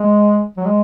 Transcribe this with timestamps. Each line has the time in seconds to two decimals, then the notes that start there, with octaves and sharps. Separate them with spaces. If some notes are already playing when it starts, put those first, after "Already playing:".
Already playing: G#3
0.57 F#3
0.65 G#3